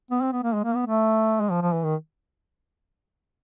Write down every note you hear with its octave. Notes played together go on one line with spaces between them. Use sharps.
B3
C4
B3
A#3
G#3
A#3
B3
A3
G#3
F3
F3
E3
D#3